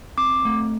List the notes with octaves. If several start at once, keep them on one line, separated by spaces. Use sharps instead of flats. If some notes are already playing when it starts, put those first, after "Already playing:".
C4 D6
A3